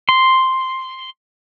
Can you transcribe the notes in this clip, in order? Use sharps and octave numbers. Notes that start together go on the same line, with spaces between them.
C6